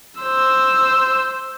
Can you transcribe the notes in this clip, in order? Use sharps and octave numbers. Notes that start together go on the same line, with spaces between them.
C5 E6